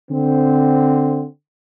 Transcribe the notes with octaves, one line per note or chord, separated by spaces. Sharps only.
D3 C4